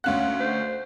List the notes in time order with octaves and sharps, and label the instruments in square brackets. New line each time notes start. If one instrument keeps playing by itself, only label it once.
[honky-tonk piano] D2 C#4 F#6 [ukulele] F5 F#5
[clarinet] C5